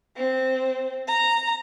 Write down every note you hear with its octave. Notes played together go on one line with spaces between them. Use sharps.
C4
A#5